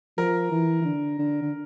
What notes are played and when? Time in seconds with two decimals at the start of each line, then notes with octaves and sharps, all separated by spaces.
0.18 F3 A#4
0.51 E3
0.81 E3
0.85 D3
1.19 D3
1.42 D3